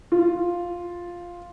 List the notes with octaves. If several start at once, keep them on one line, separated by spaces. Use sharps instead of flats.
F4